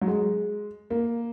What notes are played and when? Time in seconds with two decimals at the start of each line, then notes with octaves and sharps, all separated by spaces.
0.01 F#3
0.07 G#3
0.90 A#3